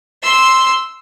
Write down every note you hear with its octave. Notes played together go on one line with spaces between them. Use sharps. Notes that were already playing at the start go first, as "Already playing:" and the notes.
C6 E6